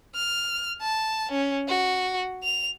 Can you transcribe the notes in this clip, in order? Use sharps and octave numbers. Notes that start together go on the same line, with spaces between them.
F6
A5
C#4
F#4
F7